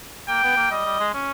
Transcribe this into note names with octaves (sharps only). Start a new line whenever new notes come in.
A#3 G5
B3
A#3
G3 D#5
G3
G#3
C#4